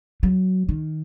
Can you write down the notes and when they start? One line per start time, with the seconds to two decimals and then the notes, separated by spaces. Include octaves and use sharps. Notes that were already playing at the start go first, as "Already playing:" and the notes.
0.23 F#3
0.69 D#3